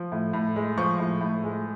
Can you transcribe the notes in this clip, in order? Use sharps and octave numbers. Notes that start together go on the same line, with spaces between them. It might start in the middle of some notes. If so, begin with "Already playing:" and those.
Already playing: F3
A2
A2
G#3
F3 C#6
A2
A2
G#3